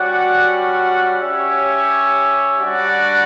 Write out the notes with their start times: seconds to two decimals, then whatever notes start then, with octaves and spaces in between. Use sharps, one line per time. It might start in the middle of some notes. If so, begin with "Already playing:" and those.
Already playing: G3 C#4 F#4 D5 F#5
1.19 C#4 G4 C#5 E5
2.60 G3 D4 F#4 D5 F#5